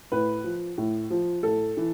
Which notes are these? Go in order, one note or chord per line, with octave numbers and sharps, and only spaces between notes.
A2 B4
F3
A2
F3
A2 A4
E3